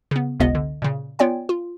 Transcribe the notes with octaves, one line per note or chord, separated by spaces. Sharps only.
C#3 B3
G1 C#2 C3 B3 D#5
D3
A#2 C#3
B3 F4 C#5 D5 G5 G#5
F4